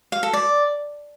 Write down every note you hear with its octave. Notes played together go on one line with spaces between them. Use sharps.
F5
A4
D5